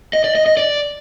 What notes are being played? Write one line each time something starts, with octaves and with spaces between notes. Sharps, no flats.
D#5
D5
D#5
D#5
D5